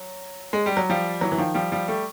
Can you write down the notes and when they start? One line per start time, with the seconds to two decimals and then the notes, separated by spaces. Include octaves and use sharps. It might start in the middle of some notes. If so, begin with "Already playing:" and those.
Already playing: F#3
0.53 G#3
0.66 G3
0.77 F#3
0.89 F3 G3
1.21 E3 F#3
1.32 E3
1.38 D#3 F3
1.54 F3 G3
1.72 F3 G3
1.88 G3 A3